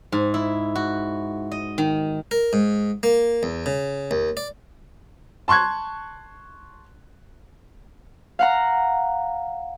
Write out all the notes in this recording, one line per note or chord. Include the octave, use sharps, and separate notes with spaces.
G#2
E4
F#4
D#5
D#3
A#4
G#2
A#3
E2
C#3
D#2
D5
A5 C6 C#6 F#6 G#6
F5 F#5 A#5